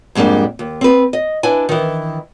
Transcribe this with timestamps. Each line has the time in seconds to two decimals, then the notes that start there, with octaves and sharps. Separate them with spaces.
0.15 F2 G#2 G3 A#3 D4
0.59 D#2
0.81 C4 B4
1.13 D#5
1.43 D4 E4 B4 G#5
1.69 D#3 E3